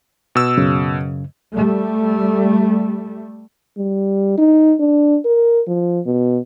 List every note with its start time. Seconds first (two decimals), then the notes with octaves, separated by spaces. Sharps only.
0.35 B2 E6
0.58 F#2 C#3
1.53 G3 A3
3.77 G3
4.38 D#4
4.80 D4
5.25 A#4
5.68 F3
6.06 B2